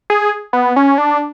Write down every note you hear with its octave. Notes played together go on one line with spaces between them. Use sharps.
G#4
B3
C#4
D4